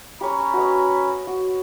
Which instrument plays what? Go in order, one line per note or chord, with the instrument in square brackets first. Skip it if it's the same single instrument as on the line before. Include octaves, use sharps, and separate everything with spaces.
[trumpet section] C#4 A#5 B5 [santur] G4 C#5
[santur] F#4 B4 D#5
F#4